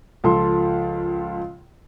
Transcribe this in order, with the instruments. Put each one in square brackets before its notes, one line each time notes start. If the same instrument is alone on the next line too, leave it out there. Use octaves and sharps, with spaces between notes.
[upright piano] C#2 F3 A4 C6